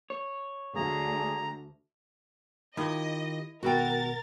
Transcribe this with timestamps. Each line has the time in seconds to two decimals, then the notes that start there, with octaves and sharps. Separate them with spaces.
0.10 C#5
0.76 D2 G#4 A#5
2.77 D#3 E4 F4 G4 D#5
3.63 G#1 B2 F#4 A#4 F#5 G5 A6